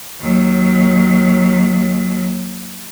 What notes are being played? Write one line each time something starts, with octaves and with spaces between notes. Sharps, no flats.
D#2 F#3